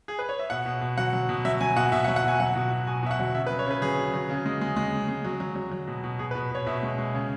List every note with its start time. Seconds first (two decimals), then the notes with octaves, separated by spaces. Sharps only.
0.08 G#4
0.19 B4
0.29 C#5
0.40 E5
0.50 B2 F#5
0.66 B2
0.81 B2
0.98 F#3 F#5
1.13 F#3
1.29 B2
1.45 F#3 E5
1.61 F#3 G#5
1.76 B2 F#5
1.92 B2 E5
2.04 F#5
2.08 F#3
2.16 F#5
2.24 B2 G#5
2.40 F#3 F#5
2.56 B2
2.71 B2
2.87 B2 G#5
3.03 B2 E5
3.11 F#5
3.19 F#3
3.35 C#3 E5
3.47 B4
3.50 F#3
3.59 C#5
3.66 C#3 B4
3.82 F#3 G#4
3.98 F#3
4.14 F#3
4.30 C#3
4.46 G#3
4.61 G#3
4.76 G#3
4.93 C#3
5.08 G#3
5.25 F#3
5.40 F#3
5.56 F#3
5.72 F#3
5.88 B2
6.04 B2
6.19 B2 G#4
6.31 B4
6.35 B2
6.51 B2 C#5
6.66 B2 E5
6.83 G#3
6.98 G#3
7.14 C#3